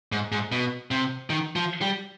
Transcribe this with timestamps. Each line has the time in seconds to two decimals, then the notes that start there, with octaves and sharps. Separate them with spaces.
0.12 G#2
0.32 G#2
0.52 B2
0.91 C3
1.30 D#3
1.56 F3
1.82 G3